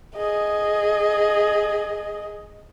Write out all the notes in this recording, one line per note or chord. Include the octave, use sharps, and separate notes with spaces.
G#4 D#5